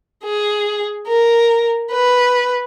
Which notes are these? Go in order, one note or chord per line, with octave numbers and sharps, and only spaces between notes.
G#4
A#4
B4